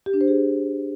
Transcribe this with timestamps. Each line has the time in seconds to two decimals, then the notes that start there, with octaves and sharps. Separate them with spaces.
0.06 G4
0.13 D4
0.21 C5
0.28 G#4